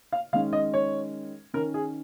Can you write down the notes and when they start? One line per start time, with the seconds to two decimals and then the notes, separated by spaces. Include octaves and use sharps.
0.12 F5
0.33 D#3 G#3 C#4 F5
0.53 D#5
0.74 C#5
1.54 D#3 C#4 A#4
1.74 G#4